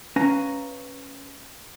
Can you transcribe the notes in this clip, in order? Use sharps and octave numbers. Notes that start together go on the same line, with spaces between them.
C#4 B4 F5 G#5 A#5